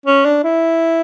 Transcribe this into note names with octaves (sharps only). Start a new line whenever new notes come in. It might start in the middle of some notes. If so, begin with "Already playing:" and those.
C#4
D4
E4